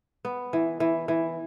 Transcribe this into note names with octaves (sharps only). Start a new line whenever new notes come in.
B3
E3
E3
E3